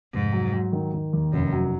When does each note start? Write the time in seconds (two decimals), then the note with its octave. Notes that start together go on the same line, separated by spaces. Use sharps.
0.13 F1 G#2
0.32 F#3
0.53 F#3
0.72 D#3
0.94 D#3
1.13 D#2
1.33 F1 F#2
1.52 F#3